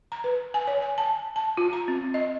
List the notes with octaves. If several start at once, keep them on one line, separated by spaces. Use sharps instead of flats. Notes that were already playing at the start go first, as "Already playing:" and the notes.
A#5
B4
G#5
C#5
G#5
A5
A5
F4
A#5
C4
D#5